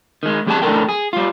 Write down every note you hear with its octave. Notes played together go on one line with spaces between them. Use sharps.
D#3 G#3
E2 G3 G4 G#4 G5 A5
F#2 A2 D3 A4 A#4 G5
G#4
G3 F4